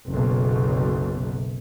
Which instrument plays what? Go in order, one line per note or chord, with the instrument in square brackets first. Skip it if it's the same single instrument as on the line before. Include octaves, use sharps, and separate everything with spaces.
[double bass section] F#1 B1